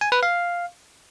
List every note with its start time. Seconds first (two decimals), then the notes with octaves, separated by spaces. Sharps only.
0.01 G#5
0.12 B4
0.23 F5